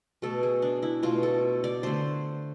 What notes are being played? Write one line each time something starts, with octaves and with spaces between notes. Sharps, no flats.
B2 A3 A4
G#4
D4
E4
B2 A3 F4
A4
D5
D3 A3 C5